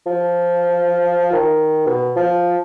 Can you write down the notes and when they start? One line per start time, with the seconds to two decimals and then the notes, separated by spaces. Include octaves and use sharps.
0.06 F3
1.33 D#3
1.86 B2
2.16 F3